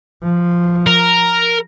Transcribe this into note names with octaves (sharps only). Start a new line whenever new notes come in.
F3
A#4